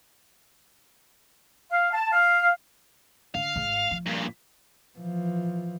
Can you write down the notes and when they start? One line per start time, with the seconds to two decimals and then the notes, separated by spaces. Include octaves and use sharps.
1.71 F5
1.94 A5
2.13 F5
3.35 D3 F5
3.56 G#1 G#2
3.91 F3
4.06 G2 A#2
4.99 E3 F3